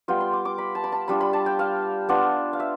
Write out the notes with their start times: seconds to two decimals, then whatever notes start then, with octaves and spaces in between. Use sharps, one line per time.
0.08 G3 B3 F4 G5
0.21 C6
0.33 D6
0.45 D6
0.58 B5
0.75 A5
0.84 B5
0.92 A5
1.08 G3 D4 F4 B5
1.21 B5
1.33 A5
1.46 G5
1.59 F5
2.09 B3 D4 F4
2.53 F5
2.60 E5